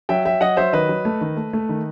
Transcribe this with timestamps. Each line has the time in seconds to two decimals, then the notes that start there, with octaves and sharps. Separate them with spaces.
0.09 F#3 E5 G5
0.25 F#3 E5 G5
0.41 F#3 D#5 F#5
0.57 F#3 C5 E5
0.73 D#3 B4 D#5
0.89 F#3
1.05 A3
1.21 D#3
1.37 A3
1.53 A3
1.69 D#3